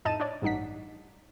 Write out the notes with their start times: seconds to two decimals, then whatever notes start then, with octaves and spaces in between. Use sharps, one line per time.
0.05 F2 A2 D#4 A5 D#7 E7
0.20 D4 C#5 D5
0.42 A1 G2 D#4 F#5 B6